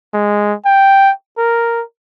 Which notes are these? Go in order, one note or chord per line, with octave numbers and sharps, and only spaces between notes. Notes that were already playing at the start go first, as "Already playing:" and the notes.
G#3
G5
A#4